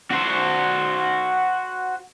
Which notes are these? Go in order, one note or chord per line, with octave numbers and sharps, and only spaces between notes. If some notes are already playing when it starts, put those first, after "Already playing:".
F#4 C5